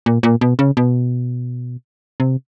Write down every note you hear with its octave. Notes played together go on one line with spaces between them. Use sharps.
A#2
A#2
B2
C#3
B2
C3